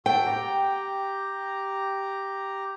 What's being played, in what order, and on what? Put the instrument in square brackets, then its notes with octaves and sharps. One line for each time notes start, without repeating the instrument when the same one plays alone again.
[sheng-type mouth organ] F#4 A4 [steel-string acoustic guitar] G5
[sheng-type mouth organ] G4 A#5